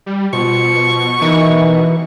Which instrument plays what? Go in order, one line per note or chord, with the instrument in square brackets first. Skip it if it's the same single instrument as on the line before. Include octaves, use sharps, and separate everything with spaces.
[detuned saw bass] G3
[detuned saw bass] B2 [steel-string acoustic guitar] F3 [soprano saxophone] C#6
[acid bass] E3 [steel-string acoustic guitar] D#4 A#4